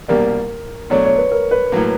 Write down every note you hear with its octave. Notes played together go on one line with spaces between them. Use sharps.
C2 B2 G3 A#3 D4 A#4
B2 F#3 A3 D4 C#5
C#5
B4
A#4
B4
A2 F#3 A#3